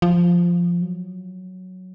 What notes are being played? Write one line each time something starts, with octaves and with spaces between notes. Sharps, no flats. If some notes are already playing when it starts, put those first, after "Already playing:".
F3
F#3